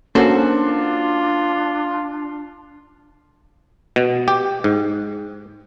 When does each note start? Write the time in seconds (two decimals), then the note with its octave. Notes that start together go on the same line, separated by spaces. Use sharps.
0.15 A#3 C#4 D4 F#4 A4 C5
0.64 F4
3.96 B2
4.28 G4
4.64 G#2